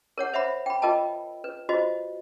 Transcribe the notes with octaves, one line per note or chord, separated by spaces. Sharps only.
A#4 C#5 F#5
C5 E5 F#5 B5
G5 B5
F4 A#4 D#5 G5 A5
B4
F4 F#4 C5 D#5